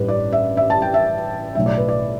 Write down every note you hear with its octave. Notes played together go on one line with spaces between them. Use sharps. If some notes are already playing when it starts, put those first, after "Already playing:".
Already playing: A1 G2 G3 B4
D5
E5
E5
A5
G5
E5
B1 A2 A3 E5
D5
B4
D5